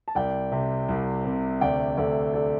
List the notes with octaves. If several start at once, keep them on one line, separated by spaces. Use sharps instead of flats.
A5
C2 D5 G5
C3
C2
C3
D2 D5 G5
D2 A4 D5
A4 D5